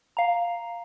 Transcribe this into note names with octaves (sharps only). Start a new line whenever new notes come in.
F5 A#5